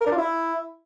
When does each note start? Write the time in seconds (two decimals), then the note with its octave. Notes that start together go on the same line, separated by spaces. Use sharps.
0.01 A#4
0.07 D4
0.12 F4
0.18 E4